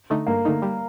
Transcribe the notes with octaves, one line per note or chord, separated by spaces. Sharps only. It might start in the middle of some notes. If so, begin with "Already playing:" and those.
D3 A3 D#4
G2 A#3
D3 A3 D#4
G3